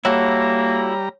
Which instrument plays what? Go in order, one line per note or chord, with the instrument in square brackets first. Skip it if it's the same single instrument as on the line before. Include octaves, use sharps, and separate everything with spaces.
[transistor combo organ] G3 A#5 [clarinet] A#3 [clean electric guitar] E4 F#4 A4 [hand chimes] C#5